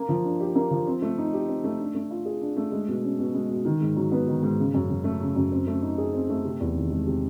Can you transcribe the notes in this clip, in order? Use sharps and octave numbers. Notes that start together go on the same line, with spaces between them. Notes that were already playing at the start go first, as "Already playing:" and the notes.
Already playing: A#3
F3
D4
G4
A#3
F3
C4
A3
D#4
G4
C4
A3
D4
A3
F4
G#4
D4
A3
G#3
B2
C#4
B2
G#3
B2
D#3
G#2
F#3
B3
D#3
G#2
C#3
F#2
F#3
A3
C#3
F#2
C4
A3
D#4
G#4
C4
A3
C3
E2
D#3
G#3
C3